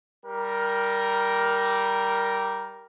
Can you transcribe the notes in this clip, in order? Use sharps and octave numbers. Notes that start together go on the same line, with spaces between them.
G3 A#4